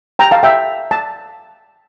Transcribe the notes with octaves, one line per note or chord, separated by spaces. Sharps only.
G5 A#5
F5 A5
E5 G5
A5